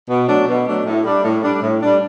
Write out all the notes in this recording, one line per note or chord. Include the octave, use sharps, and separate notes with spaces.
B2
F#3 A3 D4
B2
F#3 A3 D4
A2
G3 D4
A2
G3 D4
A2
G3 D4